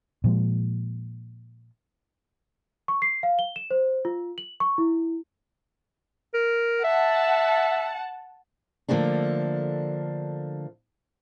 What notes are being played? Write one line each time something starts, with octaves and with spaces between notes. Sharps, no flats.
A#2 F3 G#3
C#6
C7
F5
G7
E7
C5
F4
F#7
C#6
E4
A#4
E5 F#5 A5
D3 F3 A3 A#3 D4